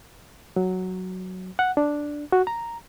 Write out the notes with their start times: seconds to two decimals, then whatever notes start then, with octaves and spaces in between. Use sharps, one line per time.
0.56 F#3
1.59 F#5
1.77 D4
2.32 F#4
2.47 A#5